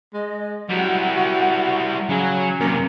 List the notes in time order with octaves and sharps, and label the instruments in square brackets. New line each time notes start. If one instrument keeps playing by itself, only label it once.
[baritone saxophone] G#3 [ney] D#5
[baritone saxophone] F#3 [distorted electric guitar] G3 E4 [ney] F#5
[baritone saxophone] F#4
[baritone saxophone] C#3 [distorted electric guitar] F#3 [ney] G#5
[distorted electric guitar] F#2 C3 [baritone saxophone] A#3